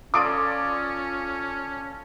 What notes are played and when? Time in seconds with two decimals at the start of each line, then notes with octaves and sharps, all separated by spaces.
0.14 C#4 F4 A4 D5 D6 D#6 D7